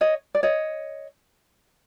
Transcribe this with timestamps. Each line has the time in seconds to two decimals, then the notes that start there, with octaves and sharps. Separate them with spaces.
0.01 C#5 D#5
0.35 D5
0.43 C#5 D#5